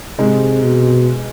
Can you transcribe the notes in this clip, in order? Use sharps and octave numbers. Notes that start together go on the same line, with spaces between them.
G#2 C3 G#3
B2